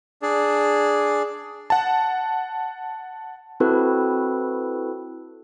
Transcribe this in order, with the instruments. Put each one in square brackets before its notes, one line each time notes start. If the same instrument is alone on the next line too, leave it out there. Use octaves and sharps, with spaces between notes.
[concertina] D4 G#4
[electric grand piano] F#5 A5
[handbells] C4 E4 F#4 A4 B4